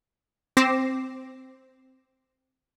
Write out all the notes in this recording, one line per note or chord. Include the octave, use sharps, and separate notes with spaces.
C4 D6 A#6 C7 E7